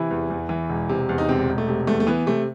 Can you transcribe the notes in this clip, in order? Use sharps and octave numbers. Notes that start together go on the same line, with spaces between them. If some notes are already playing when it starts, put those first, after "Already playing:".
Already playing: C3 E3 E4
E2
E2
E3
E1
C3
E2
D#4
E1 C3 C4
E1
A3
C3
E2 A3
A3
E3 B3
C3 A3